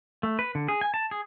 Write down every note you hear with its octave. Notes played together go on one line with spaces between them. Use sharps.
A3
B4
D3
G#4
G#5
A5
G#4